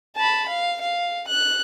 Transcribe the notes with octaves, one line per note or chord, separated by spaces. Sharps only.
A5 B5
F5
F5
F#6